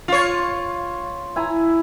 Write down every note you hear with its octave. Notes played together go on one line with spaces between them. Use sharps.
F4 C#5
E4 G#5 A#5